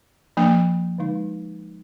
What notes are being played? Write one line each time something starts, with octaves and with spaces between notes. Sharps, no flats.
F3 A#3 D4
D3 G#3 D#4